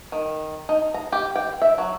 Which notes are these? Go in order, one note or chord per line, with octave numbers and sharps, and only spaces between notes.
D#3
D#4
A#5
G4
G5
E5
F#3